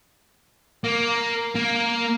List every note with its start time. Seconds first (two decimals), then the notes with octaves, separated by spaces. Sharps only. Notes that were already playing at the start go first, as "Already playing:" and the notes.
0.84 A#3
1.55 A#3